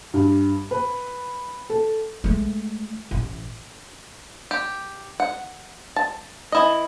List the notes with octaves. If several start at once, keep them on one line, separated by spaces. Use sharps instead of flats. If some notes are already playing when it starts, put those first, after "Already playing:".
G2
B4
A4
G#3 A3
A1
G4
F#5
A5
E3 E4 D#5